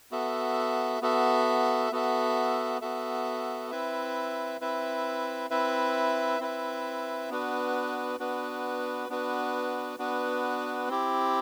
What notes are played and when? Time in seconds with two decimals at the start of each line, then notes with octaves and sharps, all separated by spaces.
0.11 B3 F#4 A4 E5
1.01 B3 F#4 A4 E5
1.92 B3 F#4 A4 E5
2.81 B3 F#4 A4 E5
3.71 C4 E4 B4 E5
4.61 C4 E4 B4 E5
5.50 C4 E4 B4 E5
6.40 C4 E4 B4 E5
7.30 B3 D4 F#4 B4
8.20 B3 D4 F#4 B4
9.09 B3 D4 F#4 B4
9.99 B3 D4 F#4 B4
10.88 C4 E4 G4